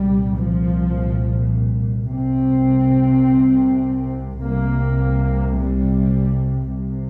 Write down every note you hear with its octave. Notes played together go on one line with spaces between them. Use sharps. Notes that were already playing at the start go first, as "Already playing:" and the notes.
Already playing: C2 A#2 G3
F3
C2 C3 C4
C2 C3 A#3
G3
C2 C3